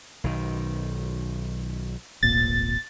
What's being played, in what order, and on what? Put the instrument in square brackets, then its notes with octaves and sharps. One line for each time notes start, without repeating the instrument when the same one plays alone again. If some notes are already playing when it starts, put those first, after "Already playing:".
[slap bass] B1 D#3
[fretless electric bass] D1 G#1 A#2 [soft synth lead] A6